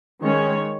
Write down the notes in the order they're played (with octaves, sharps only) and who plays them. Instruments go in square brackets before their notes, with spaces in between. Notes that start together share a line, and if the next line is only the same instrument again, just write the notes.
[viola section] D#3 G#3 C#4 C#5